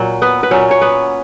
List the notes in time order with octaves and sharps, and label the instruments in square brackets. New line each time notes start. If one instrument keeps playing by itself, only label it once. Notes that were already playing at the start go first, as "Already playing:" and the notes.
Already playing: [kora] A#2 F#3
B3 B4
B4
A#2 F#3 C#4 C#5
C#5
B3 B4